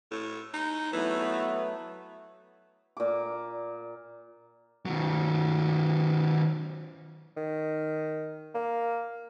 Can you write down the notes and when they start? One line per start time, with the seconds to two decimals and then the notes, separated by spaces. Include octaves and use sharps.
0.11 A2
0.54 D#4
0.93 E3 F#3 A3 B3
2.97 A#2 D6
4.86 D#3 F#3
7.37 D#3
8.55 A#3